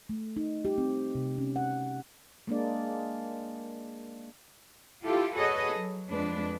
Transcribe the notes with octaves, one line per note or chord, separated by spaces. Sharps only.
A3
D#4
G4
C4
C3
C#4
F#5
G#3 A#3 D4 D5
E4 F4 G4 A4
F#4 G#4 A4 B4 C#5 D#5
F#3
F2 G#3 D4 B4